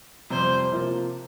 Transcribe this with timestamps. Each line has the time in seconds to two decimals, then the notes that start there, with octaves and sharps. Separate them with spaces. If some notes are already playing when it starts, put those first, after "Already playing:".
0.30 F2 C3 G3 C5
0.72 C3 F3 A#3 F4 C5